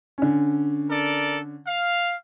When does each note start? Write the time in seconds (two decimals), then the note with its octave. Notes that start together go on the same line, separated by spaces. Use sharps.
0.18 D3 C#4
0.90 A4 A#4 D5
1.67 F5